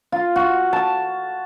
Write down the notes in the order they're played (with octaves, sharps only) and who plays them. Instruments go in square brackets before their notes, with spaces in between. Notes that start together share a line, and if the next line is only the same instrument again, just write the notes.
[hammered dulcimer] F4
F#4
A5